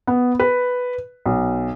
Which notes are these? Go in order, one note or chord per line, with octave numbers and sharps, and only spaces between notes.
B3
B4
B1